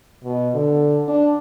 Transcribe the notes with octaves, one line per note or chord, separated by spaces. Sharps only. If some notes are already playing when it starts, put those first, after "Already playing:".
B2
D3
D4